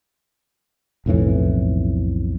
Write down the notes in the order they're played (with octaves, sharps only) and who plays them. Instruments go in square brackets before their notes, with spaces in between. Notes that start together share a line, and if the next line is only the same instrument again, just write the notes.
[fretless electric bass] B1 F2 A2 E3